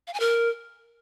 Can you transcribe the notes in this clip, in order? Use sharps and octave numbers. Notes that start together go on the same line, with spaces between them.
F5
G#5
A#4